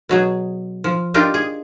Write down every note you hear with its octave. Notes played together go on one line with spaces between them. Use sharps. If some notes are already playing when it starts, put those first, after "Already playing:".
B2 F#3 G#4
F3
D4 D#4 F4 G4 A#4
G#4